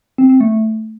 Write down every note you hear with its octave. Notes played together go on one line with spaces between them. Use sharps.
C4
C4
A3